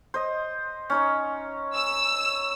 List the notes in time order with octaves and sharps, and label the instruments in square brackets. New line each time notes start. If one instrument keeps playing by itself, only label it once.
[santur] C5 D#5
C#4 D#4 C#5
[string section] E6